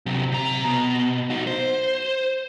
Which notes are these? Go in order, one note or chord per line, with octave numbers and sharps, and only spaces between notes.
C3 F#3
C3 A#5
B2
D#4 F#4
C5